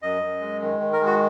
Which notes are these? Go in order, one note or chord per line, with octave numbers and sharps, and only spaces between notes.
F#2 D#5
F#2
G#3
D#3
D#3
A#4
G#3
F#4